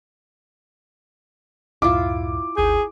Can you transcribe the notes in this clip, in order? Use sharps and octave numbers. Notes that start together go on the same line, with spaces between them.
C#2 F#2 A2 E4 F4 D6
G#1 D#2 G#4 G6